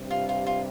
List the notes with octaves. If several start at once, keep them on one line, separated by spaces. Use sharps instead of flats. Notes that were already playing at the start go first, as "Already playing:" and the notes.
Already playing: G2 C3
F4
F4
F4